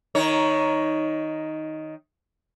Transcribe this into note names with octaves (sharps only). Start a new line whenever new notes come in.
D#3 D#4 C#5